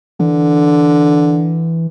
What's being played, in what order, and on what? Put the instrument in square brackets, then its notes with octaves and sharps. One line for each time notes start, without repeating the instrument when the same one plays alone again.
[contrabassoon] D3 [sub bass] E3